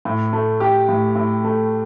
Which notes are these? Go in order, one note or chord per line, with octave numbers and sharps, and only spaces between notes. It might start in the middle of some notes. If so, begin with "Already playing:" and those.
A2
A3
A3 G4
A2
A2
A3